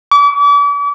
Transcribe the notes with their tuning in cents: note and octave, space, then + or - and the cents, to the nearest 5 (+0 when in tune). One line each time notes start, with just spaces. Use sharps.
D6 -40